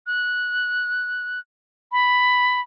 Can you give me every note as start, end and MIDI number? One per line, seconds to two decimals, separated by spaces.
0.07 1.39 90
1.92 2.60 83